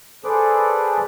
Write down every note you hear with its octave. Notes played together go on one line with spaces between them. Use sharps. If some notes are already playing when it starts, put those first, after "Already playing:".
G#4 A4 B4 C5 D5 D6